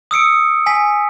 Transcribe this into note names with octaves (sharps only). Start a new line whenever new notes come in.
D#6 E6 C#7 D7
G#5 B6